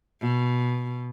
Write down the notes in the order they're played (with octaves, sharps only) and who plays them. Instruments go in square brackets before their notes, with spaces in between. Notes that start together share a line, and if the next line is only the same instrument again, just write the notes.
[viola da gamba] B2